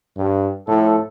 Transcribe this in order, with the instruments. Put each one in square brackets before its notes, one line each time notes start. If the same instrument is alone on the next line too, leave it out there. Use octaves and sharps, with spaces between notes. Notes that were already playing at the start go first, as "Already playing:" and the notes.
[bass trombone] G2
[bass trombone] A2 [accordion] F3 A4